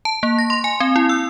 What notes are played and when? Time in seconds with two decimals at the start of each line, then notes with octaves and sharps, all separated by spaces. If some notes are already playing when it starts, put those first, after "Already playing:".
0.05 A5
0.23 A#3
0.39 A#6
0.50 C6
0.64 G#5
0.80 C4
0.96 E4
1.09 E6